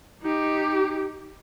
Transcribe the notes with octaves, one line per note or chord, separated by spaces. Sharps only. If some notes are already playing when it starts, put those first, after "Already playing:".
D#4 G4